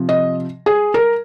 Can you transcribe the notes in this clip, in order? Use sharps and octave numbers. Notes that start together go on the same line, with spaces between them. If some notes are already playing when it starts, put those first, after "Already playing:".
Already playing: C3 F3
D#5
G#4
A#4